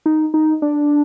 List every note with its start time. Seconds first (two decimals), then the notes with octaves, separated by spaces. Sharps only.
0.06 D#4
0.34 D#4
0.62 D4